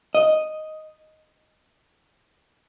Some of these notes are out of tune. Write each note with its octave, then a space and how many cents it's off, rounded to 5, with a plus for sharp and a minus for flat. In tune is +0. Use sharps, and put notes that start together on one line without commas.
D#5 +0